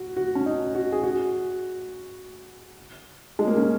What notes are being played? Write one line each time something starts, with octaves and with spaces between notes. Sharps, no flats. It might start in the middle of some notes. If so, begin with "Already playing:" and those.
Already playing: F#4
F#4
C#4
D#4
F#4
G#4
F#4
G#3
A#3
C#4